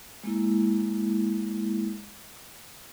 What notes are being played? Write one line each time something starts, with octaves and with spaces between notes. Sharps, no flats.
G#3 A#3 E4